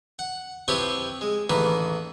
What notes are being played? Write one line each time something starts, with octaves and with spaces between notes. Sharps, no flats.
F#5
F3 C4 E4 G4 B4 C#5
G#3
A1 D#3 E3 A#3 B4